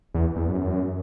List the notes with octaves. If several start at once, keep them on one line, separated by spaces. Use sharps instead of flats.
E2
E2
F#2